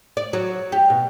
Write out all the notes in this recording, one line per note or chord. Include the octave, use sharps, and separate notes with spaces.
D5
F#3
G4
B2